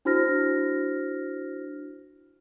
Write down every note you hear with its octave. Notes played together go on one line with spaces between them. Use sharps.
D4 E4 F#4 C5 F6 A#6